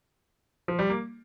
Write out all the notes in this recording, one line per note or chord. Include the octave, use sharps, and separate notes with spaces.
F3
G3
A#3